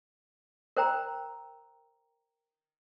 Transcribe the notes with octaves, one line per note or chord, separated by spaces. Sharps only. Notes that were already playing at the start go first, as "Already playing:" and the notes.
A#4 C5 G5 A#5